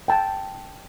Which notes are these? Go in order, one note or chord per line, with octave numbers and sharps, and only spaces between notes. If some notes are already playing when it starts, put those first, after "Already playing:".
G5 A5